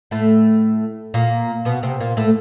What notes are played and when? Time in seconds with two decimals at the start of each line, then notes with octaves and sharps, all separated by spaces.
0.11 A2 A3
1.14 A#2 A#3
1.65 B2 B3
1.83 C3 C4
2.00 A#2 A#3
2.17 A2 A3